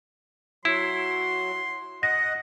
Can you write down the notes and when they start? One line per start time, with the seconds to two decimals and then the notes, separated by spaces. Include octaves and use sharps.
0.65 F#3 E4 C6
2.03 D#5 F#5 A#6